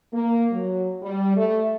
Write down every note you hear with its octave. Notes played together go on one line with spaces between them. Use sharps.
A#3
F#3
G3
A3